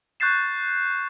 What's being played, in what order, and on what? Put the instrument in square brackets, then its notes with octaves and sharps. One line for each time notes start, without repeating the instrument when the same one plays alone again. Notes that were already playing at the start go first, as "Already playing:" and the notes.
[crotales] C#6 F#6 G6 A6 C7 E7